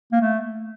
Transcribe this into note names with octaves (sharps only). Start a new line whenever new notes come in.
A#3
A3